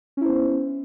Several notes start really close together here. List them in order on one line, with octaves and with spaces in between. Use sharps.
C#4 E4 C5 B3